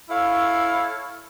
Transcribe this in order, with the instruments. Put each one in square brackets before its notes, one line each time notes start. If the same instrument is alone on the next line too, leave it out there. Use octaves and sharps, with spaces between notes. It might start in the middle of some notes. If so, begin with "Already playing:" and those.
[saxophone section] E4 A4 C#5 F5